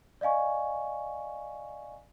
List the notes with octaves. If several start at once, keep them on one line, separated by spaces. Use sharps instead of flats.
D5 D#5 F5 G#5 C#6